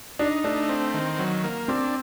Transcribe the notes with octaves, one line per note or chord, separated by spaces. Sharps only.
D4 D#4
A3 D4
C4
D#3
F#3
A#3
C4 D4